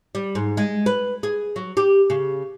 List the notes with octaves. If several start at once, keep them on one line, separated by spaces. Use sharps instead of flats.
G3
G#2
G#3
B4
G#4
F#3
G4
C#3